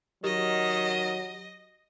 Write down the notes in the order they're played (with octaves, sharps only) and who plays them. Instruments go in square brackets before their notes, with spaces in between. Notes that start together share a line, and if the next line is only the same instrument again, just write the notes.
[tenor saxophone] D#3 [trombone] F#3 [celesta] G4 [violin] D#5